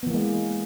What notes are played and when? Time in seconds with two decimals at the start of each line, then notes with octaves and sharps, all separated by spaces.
0.03 B3
0.07 E3
0.10 A#3
0.14 G#3